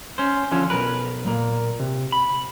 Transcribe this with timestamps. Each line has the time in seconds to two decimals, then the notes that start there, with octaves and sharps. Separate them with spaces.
0.18 C#4 C5
0.51 D3 F3 C#4
0.70 B1 A#4 B4
1.26 A#2 A#3
1.80 C3
2.12 B5